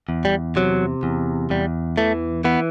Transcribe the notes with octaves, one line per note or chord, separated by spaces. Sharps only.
E2
G3
C3 F#3
E2
E2 G3
E3 A3
E3 B3